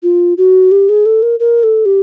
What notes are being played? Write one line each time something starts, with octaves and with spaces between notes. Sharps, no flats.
F4
F#4
G4
G#4
A4
A#4
A#4
A4
G4